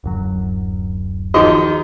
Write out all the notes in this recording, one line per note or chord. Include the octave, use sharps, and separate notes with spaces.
D1 F#2 F#3
D#3 F3 F#4 G#4 D#5